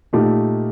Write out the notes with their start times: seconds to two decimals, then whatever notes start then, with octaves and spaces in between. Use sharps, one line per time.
0.13 A#2 A3 D#4 G4